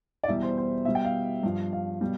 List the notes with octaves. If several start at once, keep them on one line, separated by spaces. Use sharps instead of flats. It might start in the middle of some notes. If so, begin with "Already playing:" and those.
D5
E2 B2 G3 E5
C5
C5
B2 G3 E5
G5
F5
G2 F3
F5
B2 G3